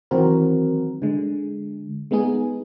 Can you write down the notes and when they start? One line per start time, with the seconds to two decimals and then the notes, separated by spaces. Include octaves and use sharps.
0.11 D#3 E3 F#3 C4 F#4 A#4
1.02 D3 G#3
2.11 G#3 B3 D#4 G#4